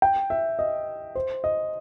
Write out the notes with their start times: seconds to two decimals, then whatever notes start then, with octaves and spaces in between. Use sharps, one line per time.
0.02 G5
0.30 E5
0.59 D#5
1.15 C5
1.44 D#5